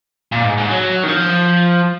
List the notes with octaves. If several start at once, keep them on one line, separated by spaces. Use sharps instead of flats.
A#2
G#2
G#2
F#3
D#3
F3